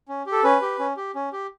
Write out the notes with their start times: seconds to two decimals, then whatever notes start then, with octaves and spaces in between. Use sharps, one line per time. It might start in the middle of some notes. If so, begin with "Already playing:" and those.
0.08 C#4
0.26 G4
0.32 A4
0.44 C#4 B4
0.62 G4
0.79 C#4
0.97 G4
1.15 C#4
1.33 G4